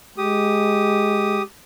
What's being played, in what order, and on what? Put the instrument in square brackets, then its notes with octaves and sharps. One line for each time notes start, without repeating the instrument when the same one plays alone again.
[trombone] G#3 [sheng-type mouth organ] G4 D#6